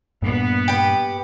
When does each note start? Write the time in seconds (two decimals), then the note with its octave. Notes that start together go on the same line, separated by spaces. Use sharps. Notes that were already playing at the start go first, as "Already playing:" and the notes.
0.22 G2 A#2 B3
0.68 G4 B4